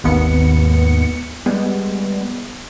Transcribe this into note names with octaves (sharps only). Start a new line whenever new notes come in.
G#1 D#2 B3 C#7
G3 G#3 B3